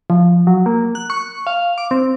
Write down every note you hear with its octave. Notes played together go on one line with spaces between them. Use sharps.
F3
F#3
A#3
F#6
C#6
F5
D6
C4